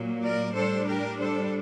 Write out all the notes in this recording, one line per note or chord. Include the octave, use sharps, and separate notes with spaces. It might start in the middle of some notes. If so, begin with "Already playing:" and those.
Already playing: A#2 F#3 A#3
A#4 D5
A2 G3 D4 A4 C5
G4 A#4
A4 C5